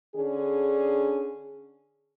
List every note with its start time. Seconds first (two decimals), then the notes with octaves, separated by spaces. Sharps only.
0.16 D3 C#4 D4 G#4